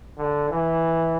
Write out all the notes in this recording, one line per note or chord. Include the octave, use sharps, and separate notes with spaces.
D3
E3